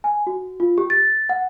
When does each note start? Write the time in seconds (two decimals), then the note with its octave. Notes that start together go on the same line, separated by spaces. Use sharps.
0.04 G#5
0.27 F#4
0.60 F4
0.78 G4
0.90 A6
1.29 F#5